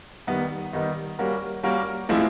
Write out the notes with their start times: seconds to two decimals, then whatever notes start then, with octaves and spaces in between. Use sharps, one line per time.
0.27 D#3 G3 B3 D#4
0.73 D#3 G3 B3 D#4
1.19 G3 A#3 C#4 F#4 A#4
1.63 G3 A#3 C#4 F#4 A#4
2.09 A2 F3 G#3 C4 E4